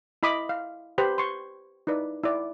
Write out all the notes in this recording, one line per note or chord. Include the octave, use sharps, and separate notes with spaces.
E4 D#5 B5 D6 D#6
F5
G4 B4 C5 B5
C6 C#6
D#4 E4 B4 D5
E4 D5